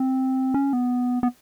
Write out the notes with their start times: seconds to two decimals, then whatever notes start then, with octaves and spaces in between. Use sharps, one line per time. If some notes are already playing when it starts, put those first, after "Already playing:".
Already playing: C4
0.54 C#4
0.73 B3
1.23 B3